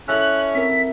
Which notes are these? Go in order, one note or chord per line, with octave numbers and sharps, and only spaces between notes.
C#4 E4 A4 F#6
C4 A#4 B6